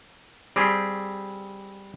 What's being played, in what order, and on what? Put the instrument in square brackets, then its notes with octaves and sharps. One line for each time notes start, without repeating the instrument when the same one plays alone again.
[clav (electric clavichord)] G3 C4 G4 G#4